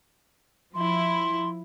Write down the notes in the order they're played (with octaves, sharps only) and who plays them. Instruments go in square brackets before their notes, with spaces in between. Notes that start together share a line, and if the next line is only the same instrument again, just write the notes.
[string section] F3 E4 [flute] C6